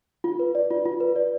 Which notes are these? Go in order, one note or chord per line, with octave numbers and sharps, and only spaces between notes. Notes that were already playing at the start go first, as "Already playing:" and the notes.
F4
B4
D5
F4
F4
B4
D5